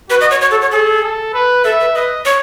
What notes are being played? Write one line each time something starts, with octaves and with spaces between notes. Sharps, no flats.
F#4 B4
D#5
C#5
C#5
A4
C#5
G#4 A4
A4
B4
A4 E5
B4
B4 D#5
C#5